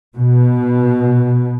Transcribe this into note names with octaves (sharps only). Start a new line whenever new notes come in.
B2